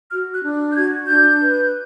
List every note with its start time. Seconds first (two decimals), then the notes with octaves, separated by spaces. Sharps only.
0.10 F#4 F6
0.32 F#6
0.42 D4
0.72 G6
0.75 F#4 G#6
1.08 D4 G6
1.42 B4